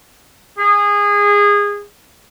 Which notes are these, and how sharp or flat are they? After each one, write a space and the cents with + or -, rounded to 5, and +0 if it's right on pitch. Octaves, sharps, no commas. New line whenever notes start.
G#4 -20